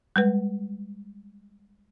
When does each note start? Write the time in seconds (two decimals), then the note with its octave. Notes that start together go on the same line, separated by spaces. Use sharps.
0.16 G3 G#3 B4